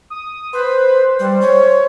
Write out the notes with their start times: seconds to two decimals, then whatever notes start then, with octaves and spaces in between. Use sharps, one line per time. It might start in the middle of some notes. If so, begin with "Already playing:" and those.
0.10 D#6
0.53 B4 C5
1.19 G3
1.41 C#5